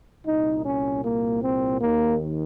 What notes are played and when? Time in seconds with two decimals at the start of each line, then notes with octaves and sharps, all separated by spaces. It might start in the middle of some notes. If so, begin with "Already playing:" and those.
0.25 C2 A#2 D#4
0.64 C#4
1.02 A#3
1.42 C4
1.79 D#2 D#3 A#3